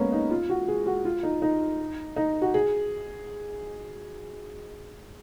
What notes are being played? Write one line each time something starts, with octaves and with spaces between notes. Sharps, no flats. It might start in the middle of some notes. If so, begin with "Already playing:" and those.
Already playing: G#3 A#3 B3 C#4
D#4
F4
F#4
G#4
F#4
F4
D#4
D#4
D#4
F#4
G#4